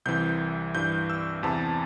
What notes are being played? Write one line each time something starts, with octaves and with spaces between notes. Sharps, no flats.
C2 C3 E3 G6
G2 E3 G6
E6
E2 C3 E3 A5